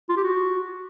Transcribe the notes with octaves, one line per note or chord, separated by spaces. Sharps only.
F4
G4
F#4